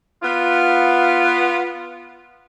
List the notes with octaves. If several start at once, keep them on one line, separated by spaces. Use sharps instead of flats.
B3 F4